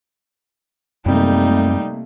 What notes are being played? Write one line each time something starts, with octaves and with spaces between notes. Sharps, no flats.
F#2 C3 G3 A3 A#3 C4 D#4